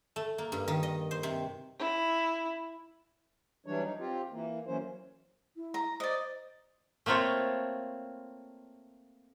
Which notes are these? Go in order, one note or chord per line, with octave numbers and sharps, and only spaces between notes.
A3
A#3
G2
D#3
D#5
C5
C3
E4
E3 F#3 G3 D4 C#5
D#4
C4 F4 G4
E3 A#3
E3 F#3 A#3 C#4 C5
E4
A#5
C5 D5 D#5
A3 A#3 C4 F4 C#5